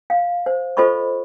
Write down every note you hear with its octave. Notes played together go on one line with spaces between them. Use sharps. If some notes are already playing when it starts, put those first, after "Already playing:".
F5
C5
F4 A4 C5 D#5 B5 C#6